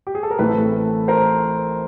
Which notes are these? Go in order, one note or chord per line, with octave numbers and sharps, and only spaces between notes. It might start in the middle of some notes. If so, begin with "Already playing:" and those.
G4
G#4
A4
A#4
A1 A2 E3 A3 C4 A4 B4
A#4 C5